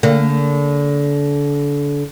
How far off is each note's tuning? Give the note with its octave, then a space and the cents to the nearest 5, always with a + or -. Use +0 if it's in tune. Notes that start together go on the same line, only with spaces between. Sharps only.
D3 -30 A#3 -30